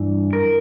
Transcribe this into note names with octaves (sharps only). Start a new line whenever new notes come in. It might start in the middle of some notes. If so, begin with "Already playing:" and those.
Already playing: G2 E3
A#4